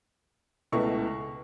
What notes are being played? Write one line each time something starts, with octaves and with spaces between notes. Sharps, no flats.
C#2 B2 A3 E4 C#6